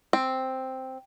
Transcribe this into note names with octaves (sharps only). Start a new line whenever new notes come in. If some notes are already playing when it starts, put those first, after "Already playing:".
C4